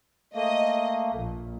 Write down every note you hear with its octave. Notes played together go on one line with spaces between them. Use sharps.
A3 A#3 D#5
A#1